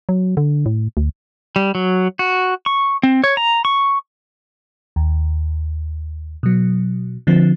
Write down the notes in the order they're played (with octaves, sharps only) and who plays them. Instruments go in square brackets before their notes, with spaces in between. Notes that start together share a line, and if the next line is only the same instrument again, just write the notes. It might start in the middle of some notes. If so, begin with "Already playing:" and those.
[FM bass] F#3
D3
A2
D2
[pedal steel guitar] G3
F#3
F#4
C#6
C4
C#5
A#5
C#6
[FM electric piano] D#2
B2 F#3
D3 F3 C4